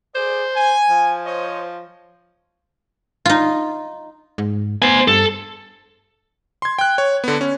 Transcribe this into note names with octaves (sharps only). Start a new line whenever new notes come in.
G#4 C5 D5
G#5
F3
C5 C#5 D#5
D#4 F4
G#2
B3 C5 G#5
G2 A4
C6 G#6
G5 F#6
C#5
D3 B3
C#4